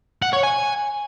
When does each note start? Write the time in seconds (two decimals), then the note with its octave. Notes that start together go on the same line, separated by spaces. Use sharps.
0.22 F#5
0.33 C#5
0.43 G#5